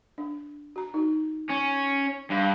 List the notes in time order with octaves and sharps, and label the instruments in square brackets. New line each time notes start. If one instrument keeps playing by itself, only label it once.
[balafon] D4
F#4 A#5
D#4 F#4
[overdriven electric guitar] C#4
[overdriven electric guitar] G2 [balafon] D4 F5